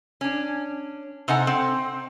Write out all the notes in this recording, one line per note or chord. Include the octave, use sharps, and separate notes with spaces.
C#4 D4
C3 D#4 A4 F#5 G#5
C4